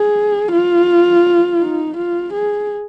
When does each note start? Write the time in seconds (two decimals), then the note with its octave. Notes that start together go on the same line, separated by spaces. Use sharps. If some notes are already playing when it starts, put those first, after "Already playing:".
Already playing: G#4
0.52 F4
1.61 D#4
1.97 F4
2.34 G#4